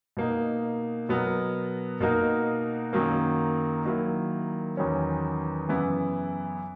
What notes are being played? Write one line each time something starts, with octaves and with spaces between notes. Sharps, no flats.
B2 A#3 D#4
B2 F#3 B3 F#4 A#4
B2 A#3 D#4 F#4 A#4
F#2 D#3 F#3 A#3
D#3 F#3 A#3 E4
E2 D#3 F#3 C#4
F#2 C#3 E3 B3 E4